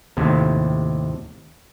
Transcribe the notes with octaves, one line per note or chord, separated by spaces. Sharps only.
D#2 A2 C3